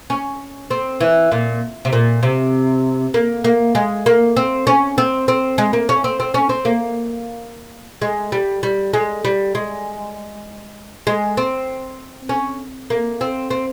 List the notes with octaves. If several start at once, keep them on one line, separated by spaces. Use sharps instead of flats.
C#4
C4
E3
A#2
C3
A#2
C3
A#3
A#3
G#3
A#3
C4
C#4
C4
C4
G#3
A#3
C#4
C4
C4
C#4
C4
A#3
G#3
G3
G3
G#3
G3
G#3
G#3
C4
C#4
A#3
C4
C4